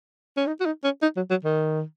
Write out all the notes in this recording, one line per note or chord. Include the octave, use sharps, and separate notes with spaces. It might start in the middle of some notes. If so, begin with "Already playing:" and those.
C#4
D#4
F#4
D#4
C#4
D#4
F#3
F#3
D#3